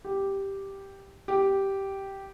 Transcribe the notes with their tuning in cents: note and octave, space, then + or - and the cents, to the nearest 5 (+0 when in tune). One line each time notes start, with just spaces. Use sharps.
G4 +0
G4 -5